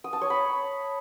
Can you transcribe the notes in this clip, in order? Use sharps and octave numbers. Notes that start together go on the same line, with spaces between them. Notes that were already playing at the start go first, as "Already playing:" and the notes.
D#6
A5
C#5
B5